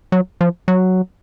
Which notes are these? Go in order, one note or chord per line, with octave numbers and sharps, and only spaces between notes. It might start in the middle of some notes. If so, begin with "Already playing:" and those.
F#3
F3
F#3